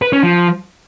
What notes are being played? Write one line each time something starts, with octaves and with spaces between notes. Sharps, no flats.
B4
C#4
F3